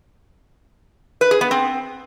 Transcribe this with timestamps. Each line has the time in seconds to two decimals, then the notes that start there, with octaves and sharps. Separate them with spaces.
1.21 B4
1.31 G#4
1.41 B3
1.51 C4